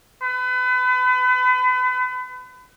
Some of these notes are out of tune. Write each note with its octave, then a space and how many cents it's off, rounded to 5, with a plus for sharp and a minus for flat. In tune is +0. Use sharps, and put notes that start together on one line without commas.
B4 +35